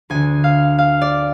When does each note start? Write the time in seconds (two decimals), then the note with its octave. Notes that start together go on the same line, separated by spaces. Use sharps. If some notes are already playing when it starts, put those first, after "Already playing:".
0.10 D2 D3 G#5
0.44 F5
0.78 F5
1.01 D5